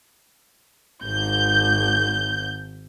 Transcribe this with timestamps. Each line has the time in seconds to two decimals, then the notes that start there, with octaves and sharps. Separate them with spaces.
1.02 G#1 G6